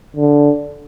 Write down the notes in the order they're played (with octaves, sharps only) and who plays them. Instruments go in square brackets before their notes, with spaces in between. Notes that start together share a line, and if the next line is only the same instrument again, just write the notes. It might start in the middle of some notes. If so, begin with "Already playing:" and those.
[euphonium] D3